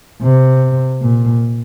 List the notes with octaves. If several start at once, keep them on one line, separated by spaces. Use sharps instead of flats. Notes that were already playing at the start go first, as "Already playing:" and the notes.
C3
A#2